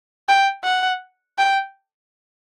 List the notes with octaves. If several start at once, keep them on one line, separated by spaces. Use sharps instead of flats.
G5
F#5
G5